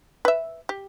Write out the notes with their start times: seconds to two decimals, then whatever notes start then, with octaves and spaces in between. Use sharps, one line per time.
0.25 B4 E5
0.69 G4